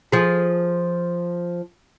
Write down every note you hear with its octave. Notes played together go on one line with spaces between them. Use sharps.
F3 G#4